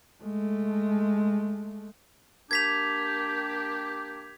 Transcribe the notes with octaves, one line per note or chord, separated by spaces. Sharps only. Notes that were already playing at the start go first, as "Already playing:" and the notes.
G#3 A3
A#3 D4 G4 G#6 B6 F7